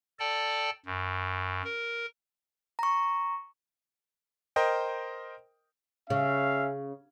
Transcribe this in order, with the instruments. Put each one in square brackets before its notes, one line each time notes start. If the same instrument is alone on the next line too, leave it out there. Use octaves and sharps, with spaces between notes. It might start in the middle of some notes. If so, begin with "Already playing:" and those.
[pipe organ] A4 D5 G5 A5
F#2
A#4
[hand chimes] A#5 C#6
[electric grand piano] A#4 C5 D#5 G5
[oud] C#3 [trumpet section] C#4 E5 F5